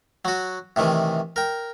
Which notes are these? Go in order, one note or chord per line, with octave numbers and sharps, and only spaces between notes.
F#3 F#4
A2 C3 D#3 E3
A#4 G5